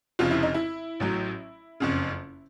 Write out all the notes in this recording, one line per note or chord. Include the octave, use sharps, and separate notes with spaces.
F1 F2 C#3 F4
E4
D#4
E4
A1 A2 F#3
F#1 F2 C#3